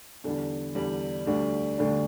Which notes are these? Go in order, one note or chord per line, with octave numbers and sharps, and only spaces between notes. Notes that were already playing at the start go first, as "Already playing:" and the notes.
E2 D3 G3 D4
E2 D3 G3 D4
D2 D3 G3 D4
D2 D3 G3 D4